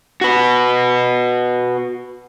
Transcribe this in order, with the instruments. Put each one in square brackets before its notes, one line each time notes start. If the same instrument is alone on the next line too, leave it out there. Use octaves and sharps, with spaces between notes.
[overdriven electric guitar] F#4 B4